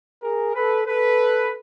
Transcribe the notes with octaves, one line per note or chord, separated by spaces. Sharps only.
G#4 A#4
A4 B4
A4 B4